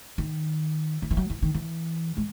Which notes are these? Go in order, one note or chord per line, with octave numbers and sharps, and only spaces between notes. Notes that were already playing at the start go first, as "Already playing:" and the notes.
D#3
D#3
E3
F#3
E3
D#3
E3
G#3